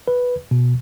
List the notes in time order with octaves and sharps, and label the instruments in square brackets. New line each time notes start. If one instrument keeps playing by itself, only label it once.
[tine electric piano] B4
B2